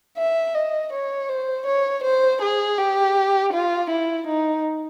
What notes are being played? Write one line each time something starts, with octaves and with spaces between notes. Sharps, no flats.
E5
D#5
C#5
C5
C#5
C5
G#4
G4
F4
E4
D#4